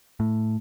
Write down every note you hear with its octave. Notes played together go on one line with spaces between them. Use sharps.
A2